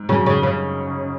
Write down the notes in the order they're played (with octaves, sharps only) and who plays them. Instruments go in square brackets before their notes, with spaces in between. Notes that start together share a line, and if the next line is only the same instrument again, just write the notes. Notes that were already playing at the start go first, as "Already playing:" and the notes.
Already playing: [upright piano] G#2
[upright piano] F#2 F#3 [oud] C#3
[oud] C#3
C#3